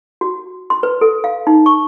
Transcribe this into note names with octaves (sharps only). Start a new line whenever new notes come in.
F#4
C6
B4
A4
F5
D#4
C#6